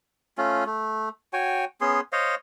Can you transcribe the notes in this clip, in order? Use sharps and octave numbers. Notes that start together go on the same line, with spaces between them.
A3 C#4 F4
A3
F#4 C#5 G5 G#5
B3 C#4 G#4 C6
C5 C#5 D#5 F5